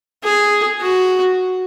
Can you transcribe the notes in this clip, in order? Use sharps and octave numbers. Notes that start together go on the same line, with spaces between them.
G#4
F#4